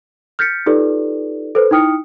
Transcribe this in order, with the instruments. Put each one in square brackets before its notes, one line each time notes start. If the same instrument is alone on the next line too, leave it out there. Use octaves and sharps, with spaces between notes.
[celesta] F6 G6 A6 B6 C#7
D#4 F4 G4 A4 B4 D5
A4 B4 C5
D#4 E4 G5 D#6 F6 C#7